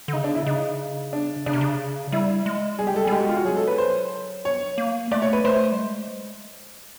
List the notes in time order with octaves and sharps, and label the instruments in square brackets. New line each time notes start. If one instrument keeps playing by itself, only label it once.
[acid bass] D3
[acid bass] C#3 [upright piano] D#4
[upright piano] D4
E4
[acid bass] C#3 [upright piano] D#4
[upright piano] D4
[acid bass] C#3 [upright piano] D4
[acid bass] C3
C#3
[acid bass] G3 [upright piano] E4
[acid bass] G#3
[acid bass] G3 [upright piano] G#4
[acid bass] G#3 [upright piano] G4
[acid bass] G3 [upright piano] A4
[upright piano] G#4
[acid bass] G3
[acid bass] G#3 [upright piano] G4
[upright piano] F#4
F4
F#4
[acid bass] F#3 [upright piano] G#4
[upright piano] A4
B4
C5
C#5
[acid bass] A#3
[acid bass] A3 [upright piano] D5
[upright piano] C#5
B4
[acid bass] A3 [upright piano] C5
[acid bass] G3
G#3